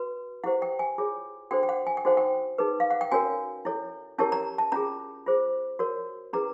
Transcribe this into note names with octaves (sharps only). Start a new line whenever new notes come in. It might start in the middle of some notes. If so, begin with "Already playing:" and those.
Already playing: F#4 B4
E4 G4 C5 F#5
G5
G#5
F4 G#4 C#5
D4 F#4 A4 C5 G5
G5
F#5
G#5
G5
D#4 F#4 A4 C5 F#5
G5
D#4 G#4 B4
F5
F#5
G5
C#4 F#4 A#4 C#5 G#5
E4 A4 C#5
C#4 E4 G4 A#4 C#5 A5
A#5
A5
C#4 F4 G#4 A#5
F4 G#4 C5
F#4 A#4 C#5
C#4 E4 G#4 B4 A#5